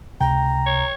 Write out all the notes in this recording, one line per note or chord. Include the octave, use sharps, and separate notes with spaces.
C#2 C3 G5 A#5
C#5